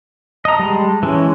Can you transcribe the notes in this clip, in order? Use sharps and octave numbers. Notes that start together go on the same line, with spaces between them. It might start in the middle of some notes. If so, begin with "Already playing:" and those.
D#5 A5 A#5
G3 G#3
E3 G#3 C#4